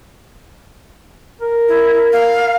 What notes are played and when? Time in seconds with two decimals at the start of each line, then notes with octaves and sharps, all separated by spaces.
1.41 A#4
1.68 E4
2.13 F5